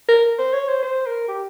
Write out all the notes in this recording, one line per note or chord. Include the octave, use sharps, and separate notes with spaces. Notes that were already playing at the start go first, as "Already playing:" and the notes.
A#4
C5
C#5
C5
C5
A#4
G4